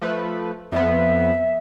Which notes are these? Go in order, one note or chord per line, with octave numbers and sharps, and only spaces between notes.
F3 A3 B4
F2 F3 B3 E5